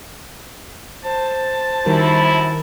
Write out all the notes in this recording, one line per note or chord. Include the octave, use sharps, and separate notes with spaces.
C5 A5
F#2 D#3 G3 E4 A#4